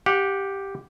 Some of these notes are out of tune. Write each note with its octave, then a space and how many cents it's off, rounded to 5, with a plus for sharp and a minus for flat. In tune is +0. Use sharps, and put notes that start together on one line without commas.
G4 +0 F#5 -25